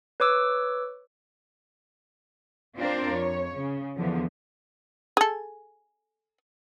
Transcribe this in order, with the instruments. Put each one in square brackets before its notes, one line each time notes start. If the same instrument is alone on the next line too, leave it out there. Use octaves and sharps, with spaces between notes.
[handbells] B4 C#5 D6 E6
[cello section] C4 D4 F4 A#4 C5 D5
F2 C#5
C#3
E2 D3 F3
[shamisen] G#4 A4